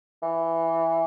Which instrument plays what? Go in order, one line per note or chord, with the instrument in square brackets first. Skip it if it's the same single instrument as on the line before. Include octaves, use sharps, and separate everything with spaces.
[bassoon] E3